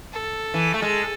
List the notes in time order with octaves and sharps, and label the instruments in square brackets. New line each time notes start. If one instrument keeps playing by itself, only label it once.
[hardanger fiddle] A4
[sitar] E3
A3
G#3